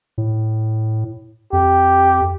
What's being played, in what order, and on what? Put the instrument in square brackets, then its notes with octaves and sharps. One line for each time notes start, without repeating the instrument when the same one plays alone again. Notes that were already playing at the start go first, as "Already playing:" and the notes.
[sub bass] A2
[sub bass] F2 [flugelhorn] G4